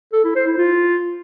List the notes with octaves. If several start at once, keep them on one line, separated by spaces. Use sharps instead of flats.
A4
E4
C5
E4
F4